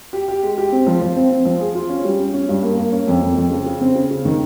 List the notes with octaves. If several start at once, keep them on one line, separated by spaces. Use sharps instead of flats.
G4
G4
G#3
G4
C4
F3
F3
C4
C4
F3
G#4
F4
C#4
G3
C#4
C#4
G2
A#3
A#3
C#4
F2
F2
F2
C#3
C#3
C4
C#3
C#3
D#3